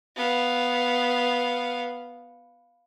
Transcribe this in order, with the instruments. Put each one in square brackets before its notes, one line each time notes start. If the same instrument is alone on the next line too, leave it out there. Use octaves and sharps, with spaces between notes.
[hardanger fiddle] B3 F5